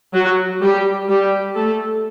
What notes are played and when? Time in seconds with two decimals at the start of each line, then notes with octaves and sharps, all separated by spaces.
0.14 F#3 F#4
0.61 G3 G4
1.09 G3 G4
1.56 A3 A4